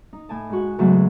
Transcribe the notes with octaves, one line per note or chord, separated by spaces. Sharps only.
D#4
A2 G#5 A5
G#2 F#4
E2 G#2 C#3 F#3 A3